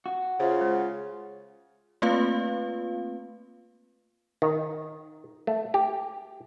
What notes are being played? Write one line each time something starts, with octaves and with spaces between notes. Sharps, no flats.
F#4
C#3 F4 C5 E5 F5
G#3
A3 A#3 C4 F4 B4 F5
D#3
A3
G4